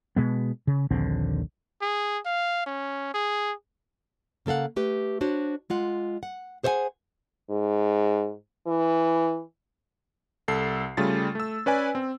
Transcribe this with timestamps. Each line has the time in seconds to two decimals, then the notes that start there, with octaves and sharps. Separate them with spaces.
0.16 B2 G#3 B3
0.67 C#3
0.91 A#1 D#2 D3 C4
1.82 G#4
2.26 F5
2.66 C#4
3.14 G#4
4.46 C#3 A#3 A4 F5 F#5
4.76 A3 G4 B4
5.21 D4 F#4 C5 C#5
5.70 G#3 F4 F#5
6.23 F#5
6.63 G#4 C5 C#5 E5 F#5 G#5
7.50 G#2
8.67 E3
10.48 C2 A4 C7
10.97 C#3 G3 A3 F4 A6
11.35 A3 E6
11.66 C#4 B4 D5 G#5
11.95 C4